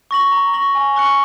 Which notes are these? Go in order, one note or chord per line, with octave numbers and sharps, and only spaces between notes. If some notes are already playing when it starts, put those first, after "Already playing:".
C#6 A#6 F#7
A#5
C#6 A#6 F#7
G#5
C#6 F#6 C#7 F#7